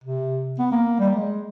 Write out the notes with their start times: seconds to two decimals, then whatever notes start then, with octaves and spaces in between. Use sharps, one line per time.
0.04 C3
0.59 B3
0.72 A#3
1.00 G3
1.15 G#3